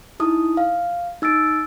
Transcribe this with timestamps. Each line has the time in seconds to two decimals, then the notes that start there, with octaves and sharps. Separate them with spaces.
0.20 D#4 E4 D#6
0.57 F5
1.22 D#4 E6 A6 D7